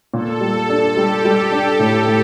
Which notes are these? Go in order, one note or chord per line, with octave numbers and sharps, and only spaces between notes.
A#2 A4
G3
D4
G3 G4
G3
D4
A2
A2